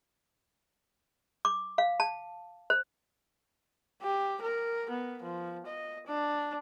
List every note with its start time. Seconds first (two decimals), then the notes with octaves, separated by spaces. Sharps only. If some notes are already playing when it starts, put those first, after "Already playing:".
1.45 D6
1.78 F5
2.00 A5
2.70 C5
4.02 G4
4.42 A#4
4.90 B3
5.23 F3
5.66 D#5
6.07 D4